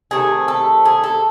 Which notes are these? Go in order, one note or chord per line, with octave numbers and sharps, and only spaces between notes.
C3 D#3 A3 G#4
A4
G#4
A4